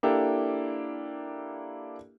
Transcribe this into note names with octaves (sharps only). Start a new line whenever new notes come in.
A#3 D4 E4 G4 A4